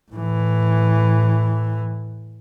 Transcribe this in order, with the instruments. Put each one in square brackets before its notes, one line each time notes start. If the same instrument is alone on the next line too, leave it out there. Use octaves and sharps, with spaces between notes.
[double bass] A2 E3